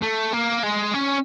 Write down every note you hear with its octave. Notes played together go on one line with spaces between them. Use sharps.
A3
A#3
G#3
C#4